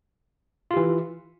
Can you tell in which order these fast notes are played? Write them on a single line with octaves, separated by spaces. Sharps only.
F4 G4 E3